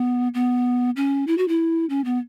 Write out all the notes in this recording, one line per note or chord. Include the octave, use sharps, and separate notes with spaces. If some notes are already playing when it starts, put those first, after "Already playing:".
Already playing: B3
B3
C#4
E4
F#4
E4
C#4
B3